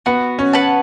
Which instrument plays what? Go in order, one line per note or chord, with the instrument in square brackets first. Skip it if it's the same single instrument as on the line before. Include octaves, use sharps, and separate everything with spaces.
[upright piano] B3 [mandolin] F#4
[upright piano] C#4
[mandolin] B4 F#5 A5